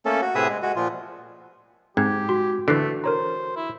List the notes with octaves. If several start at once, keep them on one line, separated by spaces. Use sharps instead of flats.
A3 A#3 C#4 A4
F#4
A2 C3 G#4 B4 E5 D#6
G#3
G#3 F#4
A#2 F3 F4
G#2 C4 G4 G#6
F#4 C6
D3 E3 A3 F#6 C7 D7
A#4 C5 C#5 A#5
E4